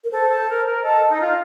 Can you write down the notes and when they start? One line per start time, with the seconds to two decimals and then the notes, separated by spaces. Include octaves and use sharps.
0.04 A#4
0.11 A4 C5
0.30 A4
0.48 A#4
0.66 A#4
0.83 A4 D#5
1.09 D#4
1.19 F4